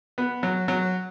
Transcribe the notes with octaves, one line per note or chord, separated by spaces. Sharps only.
B3
F#3
F#3